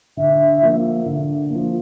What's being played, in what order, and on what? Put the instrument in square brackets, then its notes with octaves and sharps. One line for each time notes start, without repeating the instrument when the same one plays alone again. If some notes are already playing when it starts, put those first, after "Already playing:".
[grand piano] D3 [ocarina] E5
[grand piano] F3 A#3
D3
F3 A#3